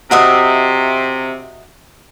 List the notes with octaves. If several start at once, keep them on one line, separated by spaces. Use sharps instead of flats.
C3 F#4 D#5 E5